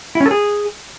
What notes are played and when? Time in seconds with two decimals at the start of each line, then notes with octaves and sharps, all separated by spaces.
0.15 E4
0.20 C#4
0.26 A4
0.31 G#4